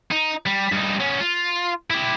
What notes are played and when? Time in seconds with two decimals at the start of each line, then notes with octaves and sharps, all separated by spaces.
0.11 D#4
0.46 G3
0.72 G2 D#4
1.00 B3 C#4
1.20 F4
1.90 E4 G4